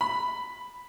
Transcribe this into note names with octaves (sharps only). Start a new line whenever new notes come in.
B5